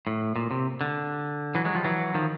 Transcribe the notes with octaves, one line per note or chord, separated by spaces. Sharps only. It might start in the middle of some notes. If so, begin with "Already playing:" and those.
A2
A#2
C3
D3
E3 F#3
F#3 G#3
F3 G3
E3 F#3
D#3 F3